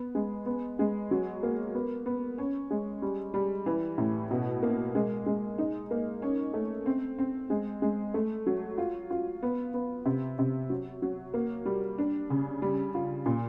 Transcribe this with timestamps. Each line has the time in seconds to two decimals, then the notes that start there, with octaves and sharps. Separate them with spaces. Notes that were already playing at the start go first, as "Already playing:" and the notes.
Already playing: B3
0.15 G#3
0.46 B3
0.79 G#3
1.11 F#3
1.43 A#3
1.74 B3
2.06 B3
2.38 C#4
2.71 G#3
3.02 G3
3.34 G3
3.66 E3
3.98 A2
4.31 B2
4.63 A#3
4.95 G#3
5.26 G#3
5.58 D#4
5.91 A#3
6.22 C#4
6.54 A3
6.86 C4
7.18 C4
7.50 G#3
7.82 G#3
8.14 A3
8.46 F#3
8.78 F4
9.10 F4
9.43 B3
9.74 B3
10.05 C3
10.39 C3
10.70 F#3
11.02 F#3
11.34 A#3
11.66 G3
11.98 D4
12.30 C#3
12.62 G3
12.95 F4
13.26 A#2